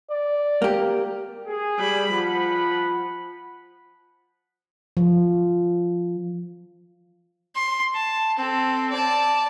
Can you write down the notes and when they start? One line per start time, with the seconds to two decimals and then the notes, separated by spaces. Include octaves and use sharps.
0.11 D5
0.62 A#3 G4
1.46 G#4
1.78 G3 B5
2.13 F3 F#5 A5 B5
4.97 F3
7.55 C6
7.95 A5
8.37 C4 A4
8.90 D5 A5